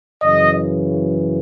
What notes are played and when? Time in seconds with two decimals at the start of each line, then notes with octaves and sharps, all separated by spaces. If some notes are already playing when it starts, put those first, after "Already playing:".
0.23 F#2 C#3 E3 D#5